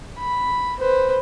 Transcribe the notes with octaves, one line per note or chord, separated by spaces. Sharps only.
B5
B4 C5